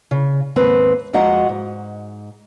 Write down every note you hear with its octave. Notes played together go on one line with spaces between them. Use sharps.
C#3
D#2 G#2 C4 B4
F2 G#3 F#4 D#5 F#5 A#5
G#2